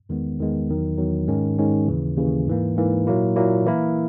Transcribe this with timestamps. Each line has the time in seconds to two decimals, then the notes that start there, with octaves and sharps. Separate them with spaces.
0.09 E2 D#3 G#3 B3
0.39 E2 D#3 G#3 B3
0.69 E2 D#3 F#3
0.98 E2 D#3 F#3
1.28 G#2 D#3 G#3 C#4
1.58 G#2 D#3 G#3 C#4
1.88 D#2 C#3 E3
2.17 D#2 C#3 E3
2.47 G#2 E3 A#3
2.77 G#2 E3 A#3
3.07 A#2 F#3 A#3 E4
3.36 A#2 F#3 A#3 E4
3.66 E3 A#3 E4 A#4